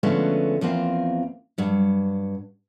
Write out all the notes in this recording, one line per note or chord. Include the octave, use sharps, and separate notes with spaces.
D3 F3 G#3 A3 B3 C#4
E2 F3 A#3 C4 F5
G2 F#3